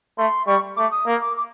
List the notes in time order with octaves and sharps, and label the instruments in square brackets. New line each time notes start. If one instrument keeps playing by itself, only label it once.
[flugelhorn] A3 [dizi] C6
[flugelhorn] G3 [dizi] C#6
[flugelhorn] A3 [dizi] D6
[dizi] D#6
[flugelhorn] A#3
[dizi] D6
D6